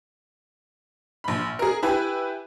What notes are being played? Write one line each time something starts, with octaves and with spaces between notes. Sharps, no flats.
A#1 B5
G#4 A#4
E4 G4 B4 G#5